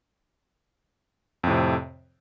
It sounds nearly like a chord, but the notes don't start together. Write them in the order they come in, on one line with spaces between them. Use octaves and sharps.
F2 A2 C3